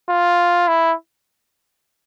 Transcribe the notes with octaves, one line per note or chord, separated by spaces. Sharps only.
F4
E4